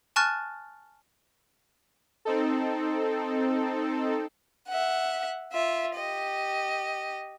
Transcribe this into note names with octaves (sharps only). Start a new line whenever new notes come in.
G#5 A5 C#6 F6 F#6 A6
C4 D#4 A4
E5 F#5
F4 E5
G4 D#5